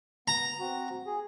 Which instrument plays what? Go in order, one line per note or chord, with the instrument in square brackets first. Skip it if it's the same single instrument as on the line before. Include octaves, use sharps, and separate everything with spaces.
[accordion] B3 [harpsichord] A#5
[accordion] C4 F#4
G#4